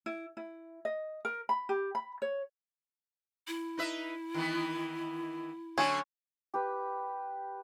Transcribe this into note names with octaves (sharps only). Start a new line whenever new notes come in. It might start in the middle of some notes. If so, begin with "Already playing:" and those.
E4
E4
D#5
A#4
B5
G4
B5
C#5
E4
D#4 B4 E5
D#3 E3 B3
D3 F#3 A3 C#4
G4 B4